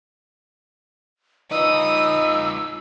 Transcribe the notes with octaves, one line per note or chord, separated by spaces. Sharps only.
D#4 F4 B4 D#6 E6